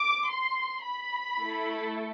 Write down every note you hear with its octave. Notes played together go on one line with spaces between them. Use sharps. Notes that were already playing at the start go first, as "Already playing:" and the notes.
Already playing: D6
C6
B5
A3 E4 A4